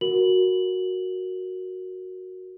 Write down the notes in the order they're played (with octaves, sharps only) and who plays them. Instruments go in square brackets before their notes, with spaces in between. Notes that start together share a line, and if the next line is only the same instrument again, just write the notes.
[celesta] F#4 A#4 F#7